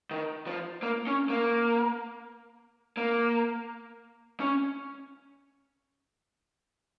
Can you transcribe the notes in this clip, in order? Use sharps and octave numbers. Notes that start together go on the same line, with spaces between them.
D#3
F3
A#3
C#4
A#3
A#3
C#4